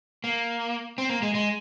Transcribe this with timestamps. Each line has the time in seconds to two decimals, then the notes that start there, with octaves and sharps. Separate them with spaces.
0.24 A#3
0.98 C4
1.09 A#3
1.23 G#3
1.35 G#3